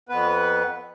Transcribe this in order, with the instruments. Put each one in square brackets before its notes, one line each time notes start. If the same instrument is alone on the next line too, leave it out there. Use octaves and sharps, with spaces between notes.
[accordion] F2 B3 B4